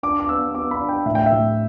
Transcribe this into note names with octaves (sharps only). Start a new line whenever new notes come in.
D4 D6
D6
B3 E6
B3 D6
B5
D4
G5
A2 E5
G5
E5
A2